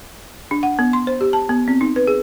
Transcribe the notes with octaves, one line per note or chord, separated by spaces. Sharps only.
D4
F#5
B3
C6
C5
G4
A5
B3
C4
D#4
B4
G#4